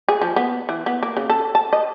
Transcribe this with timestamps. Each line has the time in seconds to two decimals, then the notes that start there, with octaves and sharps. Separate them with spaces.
0.08 G#4
0.21 F3
0.36 B3
0.69 E3
0.86 B3
1.03 A#3
1.17 C#3
1.30 A4
1.55 A5
1.73 D#5